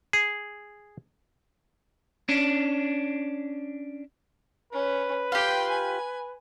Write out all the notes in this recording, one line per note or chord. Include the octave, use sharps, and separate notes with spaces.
G#4
C#4 D4
C#4 B4
F4 G4 G5 C6
G#5